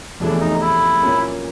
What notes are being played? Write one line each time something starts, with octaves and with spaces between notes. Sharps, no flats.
F1 E2 C#3 E3 A3 D4
D#4
E4
A#2 F#3 A#3 C#4